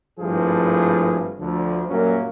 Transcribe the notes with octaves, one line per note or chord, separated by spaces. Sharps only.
G#1 G2 F3 A3 E4 G#4
D2 D3 F3
F#2 A#2 F#3 G3 A#3 C#4